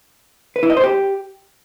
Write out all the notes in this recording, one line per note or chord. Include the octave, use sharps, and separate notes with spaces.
B4
E4
D#5
C5
G4